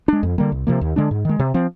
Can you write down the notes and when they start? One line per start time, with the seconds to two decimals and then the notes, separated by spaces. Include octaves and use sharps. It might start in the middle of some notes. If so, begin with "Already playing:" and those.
0.08 G#3 D4
0.23 F2
0.38 D3 G3 A#3
0.52 C2
0.67 C3 F3 A#3
0.81 D#2
0.96 D3 G#3 D4
1.11 G#2
1.25 D#3 G#3
1.39 C3
1.54 F3 C4